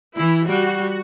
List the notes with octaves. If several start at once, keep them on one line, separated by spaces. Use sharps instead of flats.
E3 E4
G3 F#4